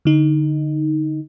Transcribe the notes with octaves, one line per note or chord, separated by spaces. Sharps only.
D3 D#4